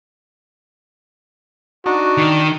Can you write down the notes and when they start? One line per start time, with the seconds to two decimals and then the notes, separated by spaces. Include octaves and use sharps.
1.86 D4 D#4 F#4
2.17 D#3